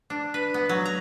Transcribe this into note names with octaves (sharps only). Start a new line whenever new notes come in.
D4
B4
B3
F#3
A#5